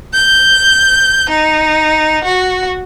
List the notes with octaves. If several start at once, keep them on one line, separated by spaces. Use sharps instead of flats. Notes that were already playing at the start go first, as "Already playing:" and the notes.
G6
D#4
F#4